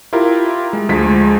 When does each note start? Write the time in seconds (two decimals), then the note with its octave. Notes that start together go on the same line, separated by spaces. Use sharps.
0.13 E4 F4 G4 A#4
0.73 G#3
0.89 D2 F3 G#3 B6